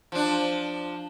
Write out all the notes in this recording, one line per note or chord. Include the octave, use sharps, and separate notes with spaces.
F3 D4